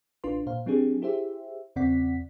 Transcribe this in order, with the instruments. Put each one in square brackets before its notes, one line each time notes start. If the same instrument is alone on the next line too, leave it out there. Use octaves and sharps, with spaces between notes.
[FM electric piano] A1 D4 F4 B4 C6
A#2 C5 F5
F#3 C4 D4 G4 G#4
E4 G4 G#4 C5 E5
E2 C#3 C4 D5 F#5 B6